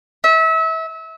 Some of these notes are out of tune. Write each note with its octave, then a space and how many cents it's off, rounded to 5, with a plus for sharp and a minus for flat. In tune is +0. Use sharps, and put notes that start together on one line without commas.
E5 -30